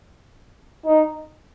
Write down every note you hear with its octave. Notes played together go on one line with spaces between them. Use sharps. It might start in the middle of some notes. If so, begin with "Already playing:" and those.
D#4